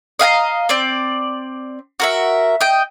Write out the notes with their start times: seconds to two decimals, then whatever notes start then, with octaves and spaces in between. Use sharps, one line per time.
0.19 D#5 F5 G5 A#5
0.69 C4 D5
2.00 F#4 A#4 E5
2.61 D#5 G5